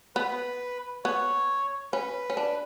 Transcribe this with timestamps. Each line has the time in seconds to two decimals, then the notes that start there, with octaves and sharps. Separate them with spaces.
0.16 B3 B4
1.05 B3 C#5
1.93 C#4 B4
2.30 C#4
2.37 D4